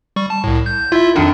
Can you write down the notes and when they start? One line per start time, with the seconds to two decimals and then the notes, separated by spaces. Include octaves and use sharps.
0.16 G3 C#6
0.30 A5
0.44 C2 A2
0.66 G6
0.92 E4 F4 E5
1.16 F2 D3 D#3 F#3 D4